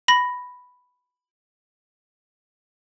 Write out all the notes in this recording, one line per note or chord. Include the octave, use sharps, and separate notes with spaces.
B5 A#6